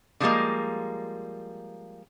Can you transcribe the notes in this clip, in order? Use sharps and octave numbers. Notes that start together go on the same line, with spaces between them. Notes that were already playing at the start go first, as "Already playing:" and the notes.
D3 F3 G3 G#3 A#3